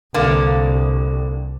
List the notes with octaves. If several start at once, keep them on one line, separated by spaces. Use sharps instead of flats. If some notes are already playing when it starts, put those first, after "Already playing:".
C2 D3 A#3